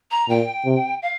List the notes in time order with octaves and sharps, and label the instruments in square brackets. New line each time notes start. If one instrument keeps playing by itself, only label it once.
[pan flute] A#5
[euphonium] A#2 [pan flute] G5
[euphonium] C3
[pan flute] F5